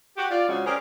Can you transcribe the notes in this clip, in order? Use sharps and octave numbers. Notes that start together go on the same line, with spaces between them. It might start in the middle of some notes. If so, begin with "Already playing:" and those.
F#4 G4
F4 D5
C#3 F3 G#3 C#4 D4 F#4
C#4 G4 G#4 A#4 C5 D5